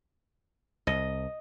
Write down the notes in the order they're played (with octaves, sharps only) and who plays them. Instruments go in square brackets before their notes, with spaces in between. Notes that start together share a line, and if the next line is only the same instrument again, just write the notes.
[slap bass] C2 [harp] D#5